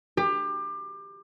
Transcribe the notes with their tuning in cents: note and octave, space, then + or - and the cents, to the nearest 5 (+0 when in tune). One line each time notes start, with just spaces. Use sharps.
G4 +25